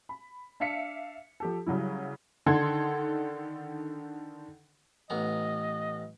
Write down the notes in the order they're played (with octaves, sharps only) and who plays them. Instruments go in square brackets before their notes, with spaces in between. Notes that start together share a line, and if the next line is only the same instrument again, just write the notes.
[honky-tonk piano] B5
D4 E5 F5 B6 C#7
F3 G4 A4
C#3 F#3 G3 E4
D3 D#3 A4 F#5 C6 G#6
[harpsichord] A1 B3 A#5 [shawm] D#5